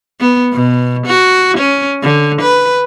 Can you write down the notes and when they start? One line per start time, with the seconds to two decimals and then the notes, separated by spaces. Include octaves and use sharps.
0.20 B3
0.53 B2
1.07 F#4
1.58 C#4
2.02 D3
2.42 B4